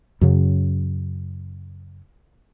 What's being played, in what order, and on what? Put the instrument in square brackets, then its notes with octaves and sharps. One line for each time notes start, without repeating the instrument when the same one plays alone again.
[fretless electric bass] F#2 C#3 F#3